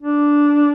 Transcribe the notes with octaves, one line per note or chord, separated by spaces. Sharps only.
D4